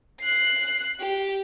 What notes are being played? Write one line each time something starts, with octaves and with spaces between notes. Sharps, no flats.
F#6 C7
G4